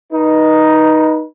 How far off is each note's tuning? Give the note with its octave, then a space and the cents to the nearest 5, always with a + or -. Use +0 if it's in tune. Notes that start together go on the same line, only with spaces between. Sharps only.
D#4 +0 B4 -30